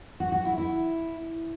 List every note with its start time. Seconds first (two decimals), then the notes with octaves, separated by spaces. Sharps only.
0.20 F#4
0.32 F#4
0.45 E4
0.58 E4